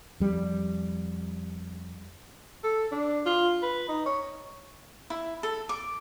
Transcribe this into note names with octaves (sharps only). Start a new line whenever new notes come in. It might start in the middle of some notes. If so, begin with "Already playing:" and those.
F2 G3
A4
D4
F4
B4
D#4
C#5
E4
A4
D6